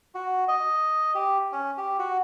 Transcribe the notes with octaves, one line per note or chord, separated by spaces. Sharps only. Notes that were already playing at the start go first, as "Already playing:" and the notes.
F#4
D#5
G4
C#4
G4
F#4